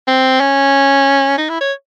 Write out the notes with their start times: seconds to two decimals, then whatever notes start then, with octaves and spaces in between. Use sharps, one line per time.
0.07 C4
0.40 C#4
1.38 D#4
1.49 E4
1.61 C#5